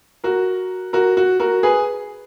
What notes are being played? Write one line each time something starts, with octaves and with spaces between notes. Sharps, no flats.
F#4 A#4
F#4 A#4
F#4
F#4 A#4
G#4 B4